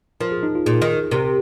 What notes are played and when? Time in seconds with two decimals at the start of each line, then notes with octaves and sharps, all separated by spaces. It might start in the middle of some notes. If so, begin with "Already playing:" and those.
0.20 F3 A#4
0.32 G#4
0.43 D#4
0.55 F4
0.66 A#2 G#4
0.82 D#3
1.11 C3 A#4